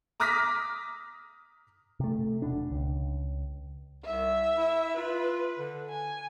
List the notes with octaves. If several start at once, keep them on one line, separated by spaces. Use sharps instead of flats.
A#5 D6 D#6 F6 A#6 B6
C3 A3
E1 B2 D4
C#2
C2 E5
E4
F4 B4
D3
G#5